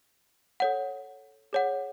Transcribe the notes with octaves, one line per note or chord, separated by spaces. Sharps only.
A4 C#5 F#5
G#4 C#5 F#5